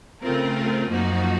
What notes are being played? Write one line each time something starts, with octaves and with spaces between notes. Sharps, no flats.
C#3 A3 C4 F4 A#4
F#2 F3 A#3 D#4 F#4